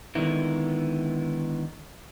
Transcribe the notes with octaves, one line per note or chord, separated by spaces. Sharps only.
D3 D#3 G#3 B3 E4